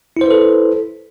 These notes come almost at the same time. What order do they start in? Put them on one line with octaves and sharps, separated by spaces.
E4 C5 B4 A4